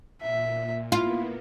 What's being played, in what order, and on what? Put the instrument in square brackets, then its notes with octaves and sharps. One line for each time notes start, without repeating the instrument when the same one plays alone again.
[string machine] A#2 [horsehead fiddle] E5
[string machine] A#3 B3 [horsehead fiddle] E4 [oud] F4